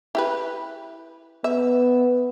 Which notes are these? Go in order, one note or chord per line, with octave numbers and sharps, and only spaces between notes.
E4 G4 B4
B3 E5